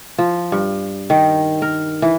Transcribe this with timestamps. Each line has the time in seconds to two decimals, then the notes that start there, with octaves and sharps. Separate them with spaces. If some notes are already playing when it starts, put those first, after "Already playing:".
0.18 F3
0.52 G2
1.10 D#3
1.62 A#4
2.02 E3